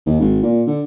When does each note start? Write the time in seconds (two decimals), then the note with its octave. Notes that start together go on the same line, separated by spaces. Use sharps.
0.06 D#2
0.20 G#1
0.43 A#2
0.67 D3